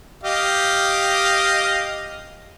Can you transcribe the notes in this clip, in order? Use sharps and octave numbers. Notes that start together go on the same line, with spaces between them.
G4 D#5 F5